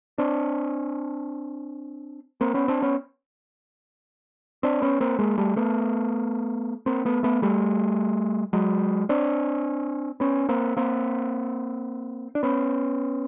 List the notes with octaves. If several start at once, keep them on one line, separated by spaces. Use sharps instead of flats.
C4 D4
A#3 C4
B3 C#4
C4 D4
B3 C#4
C4 D4
B3 C#4
A#3 C4
G#3 A#3
G3 A3
A3 B3
A#3 C4
A3 B3
A3 B3
G3 A3
F#3 G#3
C4 D4
B3 C#4
A#3 C4
A#3 C4
D4
B3 C#4